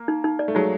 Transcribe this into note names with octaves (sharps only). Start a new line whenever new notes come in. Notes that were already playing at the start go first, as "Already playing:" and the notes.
Already playing: A#3
D#4
D#4
D5
A3
F#3 G#3 D#4